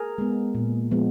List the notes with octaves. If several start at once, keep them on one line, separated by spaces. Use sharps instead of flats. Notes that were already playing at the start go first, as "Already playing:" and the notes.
Already playing: G#4 A#4
G#3 B3
A#2
F3 G#3 B3